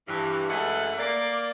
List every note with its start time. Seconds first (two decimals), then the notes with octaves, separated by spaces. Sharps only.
0.08 G2 E3
0.49 F#2 E3 G#3 A3 A4 F#5
0.98 A#3 D5